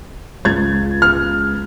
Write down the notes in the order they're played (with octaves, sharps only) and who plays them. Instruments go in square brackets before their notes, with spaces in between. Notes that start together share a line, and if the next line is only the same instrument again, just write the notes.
[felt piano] C#2 G#6 A6
[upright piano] F6